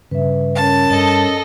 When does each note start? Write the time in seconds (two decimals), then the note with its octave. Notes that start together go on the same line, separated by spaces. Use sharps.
0.11 G2 C#3 B4 E5
0.57 C#4 A#4 C#5 A5
0.90 G2 A4 D#5